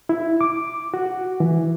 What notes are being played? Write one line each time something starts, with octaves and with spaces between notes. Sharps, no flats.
E4
D6
F#4
E3